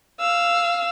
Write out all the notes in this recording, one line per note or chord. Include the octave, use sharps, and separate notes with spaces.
F5 E6